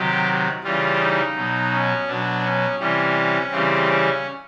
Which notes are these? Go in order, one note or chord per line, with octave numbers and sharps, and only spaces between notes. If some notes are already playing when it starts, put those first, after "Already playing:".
Already playing: C3 D#3 F#3 G4
C#3 E3 G3 F4
D#4
B2 F#3
C#4
B2 F#3 D4
C#4
C3 E3 G3 C#4
C#3 E3 G3 C4
C#4